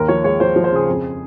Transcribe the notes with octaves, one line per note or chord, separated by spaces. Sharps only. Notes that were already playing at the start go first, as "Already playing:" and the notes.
Already playing: D#2 A#4
F3 C#5
G#3 C#5
F3 C5
F3
C5
C#3 G#4
F2